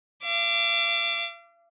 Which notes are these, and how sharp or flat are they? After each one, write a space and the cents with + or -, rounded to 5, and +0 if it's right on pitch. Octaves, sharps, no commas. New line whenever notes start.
F5 -45 D6 +0